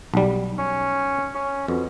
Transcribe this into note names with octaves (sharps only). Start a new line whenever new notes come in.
B1 G3
C#4
C#4
F2 B2